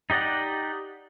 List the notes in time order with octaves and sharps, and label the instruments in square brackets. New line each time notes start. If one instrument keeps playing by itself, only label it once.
[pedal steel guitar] D#4 G4 D5 D#5 F#5